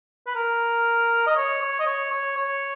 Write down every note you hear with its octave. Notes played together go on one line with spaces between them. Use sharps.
B4
A#4
D#5
C#5
C#5
D#5
C#5
C#5
C#5